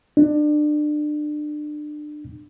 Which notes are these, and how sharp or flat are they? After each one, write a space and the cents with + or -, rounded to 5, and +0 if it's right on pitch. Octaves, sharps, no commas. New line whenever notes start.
D4 +30